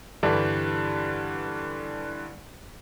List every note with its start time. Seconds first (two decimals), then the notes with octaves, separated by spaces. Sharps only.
0.23 G2 D3 E3 G3